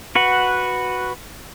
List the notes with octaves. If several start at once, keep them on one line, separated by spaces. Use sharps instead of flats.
F#4 B4 F#5